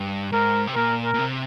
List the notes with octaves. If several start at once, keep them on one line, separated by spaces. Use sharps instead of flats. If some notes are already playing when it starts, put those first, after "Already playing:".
Already playing: G2
G#2 A#4
C3
A#2 A#4
A#4
A#2
C3